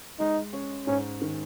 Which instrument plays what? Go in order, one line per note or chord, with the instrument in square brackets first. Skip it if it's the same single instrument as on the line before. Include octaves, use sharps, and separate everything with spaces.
[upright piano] G#3 [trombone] D#4
[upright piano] C#4
[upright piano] G#2 [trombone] C#4
[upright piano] D#3